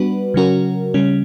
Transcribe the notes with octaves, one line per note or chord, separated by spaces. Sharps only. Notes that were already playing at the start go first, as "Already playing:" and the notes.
Already playing: G3 B3 D4 F#4 B4
C#3 F#3 C#4 F#4 A#4
C#3 G3 C#4